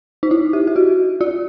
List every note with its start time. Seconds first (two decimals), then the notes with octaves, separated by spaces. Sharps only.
0.23 D#4
0.31 E4
0.53 G4
0.67 G4
0.76 F#4
1.21 F4